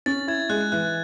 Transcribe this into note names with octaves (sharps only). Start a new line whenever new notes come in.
C#4 A6
E4 G#6
G#3 F#6
E3 F#6